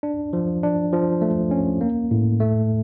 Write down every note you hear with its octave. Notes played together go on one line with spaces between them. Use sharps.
D4
F3
D4
F3
A3
C#4
A#3
A2
A3